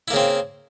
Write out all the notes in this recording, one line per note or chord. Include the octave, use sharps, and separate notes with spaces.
C#3 A#3 C4 E4